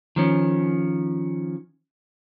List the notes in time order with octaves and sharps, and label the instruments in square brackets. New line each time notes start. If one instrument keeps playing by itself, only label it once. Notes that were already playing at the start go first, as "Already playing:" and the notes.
[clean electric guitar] D#3 F3 C#4